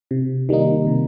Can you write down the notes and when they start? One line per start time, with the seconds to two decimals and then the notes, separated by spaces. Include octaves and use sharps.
0.11 C3
0.49 D#3 G3 A#3 D#4
0.87 C3